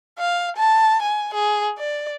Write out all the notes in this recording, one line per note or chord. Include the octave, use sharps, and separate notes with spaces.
F5
A5
G#5
G#4
D5